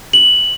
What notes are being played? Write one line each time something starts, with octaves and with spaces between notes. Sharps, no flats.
F#7